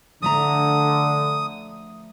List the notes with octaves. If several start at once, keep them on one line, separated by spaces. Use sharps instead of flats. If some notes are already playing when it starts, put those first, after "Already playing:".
D3 F3 A3 A#5 D#6